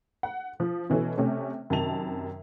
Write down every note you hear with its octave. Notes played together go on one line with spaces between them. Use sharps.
F#5
F3
B2 E3 C#4 A4
C3 A3 C#4
F#2 C3 D#3 A5 F7